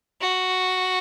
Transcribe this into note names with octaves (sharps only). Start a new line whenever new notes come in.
F#4